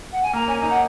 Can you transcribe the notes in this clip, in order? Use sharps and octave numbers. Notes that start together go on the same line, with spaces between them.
F#5
G#5
A#3 A#5
C#4 G#5
D#4 A#5
F#5